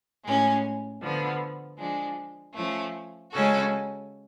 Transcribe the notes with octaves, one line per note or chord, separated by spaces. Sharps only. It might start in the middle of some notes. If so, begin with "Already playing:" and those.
A2 G#3 C#4
D3 F3 B3
F3 G#3 D4
F3 A3 C#4
C#3 G#3 C#4 F#4 A4